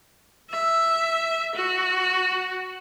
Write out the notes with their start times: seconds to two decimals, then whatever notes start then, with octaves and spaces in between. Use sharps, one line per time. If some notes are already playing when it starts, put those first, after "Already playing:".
0.51 E5
1.55 F#4